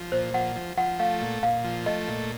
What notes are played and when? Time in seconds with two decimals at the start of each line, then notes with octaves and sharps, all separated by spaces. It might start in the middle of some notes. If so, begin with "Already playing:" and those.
Already playing: F3
0.12 A#2 C5
0.34 F3 F#5
0.56 F3
0.77 F3 F#5
0.99 A3 F5
1.21 A#2
1.43 A#2 F5
1.64 F3
1.86 A3 D#5
2.08 A#2